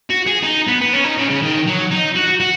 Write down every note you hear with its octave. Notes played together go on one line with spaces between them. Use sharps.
F#4
G#4
D#4
B3
B3
C#4
D#4
C#3
C#3
D#3
F#3
D#4
F#4
F#4